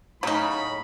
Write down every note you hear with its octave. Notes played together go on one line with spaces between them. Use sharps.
A2 C#3 F#3 D#4 B5